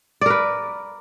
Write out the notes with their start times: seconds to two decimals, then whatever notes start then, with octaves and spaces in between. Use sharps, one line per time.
0.21 D5
0.26 A#4
0.30 B4